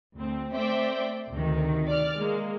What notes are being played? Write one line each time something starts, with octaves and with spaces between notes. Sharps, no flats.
D2 C4
A3 C4 C5 D5 E5 G5
D2 C3 D#3
D5 F6
G#3 A#3